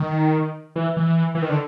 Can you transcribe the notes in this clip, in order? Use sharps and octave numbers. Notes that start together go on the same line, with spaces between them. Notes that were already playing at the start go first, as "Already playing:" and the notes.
Already playing: D#3
E3
E3
E3
D#3
D3